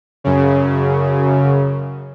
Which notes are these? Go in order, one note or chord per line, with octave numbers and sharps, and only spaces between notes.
F#2 C#3